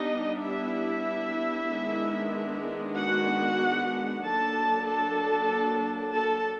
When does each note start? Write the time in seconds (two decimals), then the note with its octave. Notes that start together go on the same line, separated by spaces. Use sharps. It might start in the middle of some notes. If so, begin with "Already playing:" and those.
Already playing: G3 B3 D4 D#4 D#5
0.42 E4 E5
1.70 D#3 G#3 B3 D4
2.96 F#4 F#5
4.24 F#3 A#3 D4 A4 A5
4.87 A4 A5
6.15 A4 A5